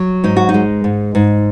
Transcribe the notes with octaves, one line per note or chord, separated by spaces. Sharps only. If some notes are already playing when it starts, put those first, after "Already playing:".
Already playing: F#3
G#2 D#4
F#4
D#4
G#3
G#2
G#2